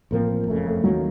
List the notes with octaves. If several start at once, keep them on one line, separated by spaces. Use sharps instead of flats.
A1 A2 F3 A#3 C4
F#1 F2 C#3 A3
A3
D#2 D#3 F#3 A#3 C#4